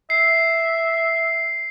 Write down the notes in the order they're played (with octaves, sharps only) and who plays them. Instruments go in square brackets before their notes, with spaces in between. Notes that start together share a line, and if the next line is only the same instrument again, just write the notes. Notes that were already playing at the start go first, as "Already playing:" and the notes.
[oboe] E5 [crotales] C7